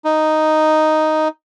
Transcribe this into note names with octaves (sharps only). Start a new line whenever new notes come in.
D#4